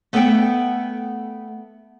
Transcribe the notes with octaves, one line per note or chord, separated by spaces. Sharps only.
A3 B3 A4 E5 F5 G5